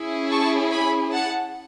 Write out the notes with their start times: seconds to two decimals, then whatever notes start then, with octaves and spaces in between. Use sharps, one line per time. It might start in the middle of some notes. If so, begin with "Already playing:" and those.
Already playing: C#4 E4 G#4
0.31 A5 C#6
0.72 G#5 B5
1.12 F#5 A5